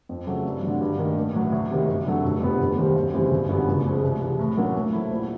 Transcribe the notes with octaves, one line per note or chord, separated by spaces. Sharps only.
F2
C#3 F#3 A3
G2
D3 F#3
G2
D#3 G3 A#3 D4
A1
A2 F#3
D2
C3 D#3 G3
F#2
D3 F#3 A3
F1
F2 D3 G3 B3
F1
D#2 D#3 G3 C4
F#2
C#3 E3 G3 C4
G1
F#2 D3 G3 B3
C#2
C#3 F3 G#3
C2
C3 E3 G3
A2
F#3 A#3 C#4
A2
F#3 A3 C4 E4
A#1